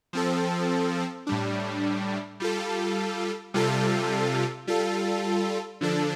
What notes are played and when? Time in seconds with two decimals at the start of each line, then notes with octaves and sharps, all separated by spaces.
0.13 F3 C4 A4
1.27 A2 G3 D4
2.40 G3 F4 A4
3.54 C3 G3 F4 A4
4.67 G3 F4 A4
5.81 D3 F3 D4 A4